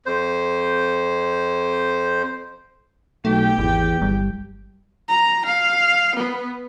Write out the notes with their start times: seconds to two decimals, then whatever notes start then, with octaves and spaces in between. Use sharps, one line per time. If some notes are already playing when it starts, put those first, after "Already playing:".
0.06 F2 C5
3.25 B1 A3 G4 G5
3.59 G#1 E2
4.02 G1 G3
5.09 A#5
5.46 F5
6.16 B3